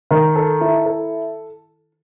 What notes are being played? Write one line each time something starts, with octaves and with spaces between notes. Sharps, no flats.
D#3
A4
E4
A4